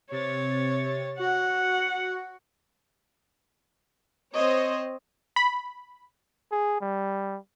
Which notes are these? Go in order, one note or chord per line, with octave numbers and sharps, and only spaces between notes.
C3 C#5 A6
F#4 F#5
C4 C5 C#5 D#5
B5
G#4
G3